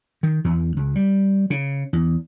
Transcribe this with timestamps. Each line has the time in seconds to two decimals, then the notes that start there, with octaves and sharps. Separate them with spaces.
0.23 D#3
0.44 E2
0.77 C#2
0.95 G3
1.50 C#3
1.93 E2